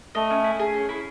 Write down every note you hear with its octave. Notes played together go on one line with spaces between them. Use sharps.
A3 D#5
C#4
E4
G#4
C#4
E4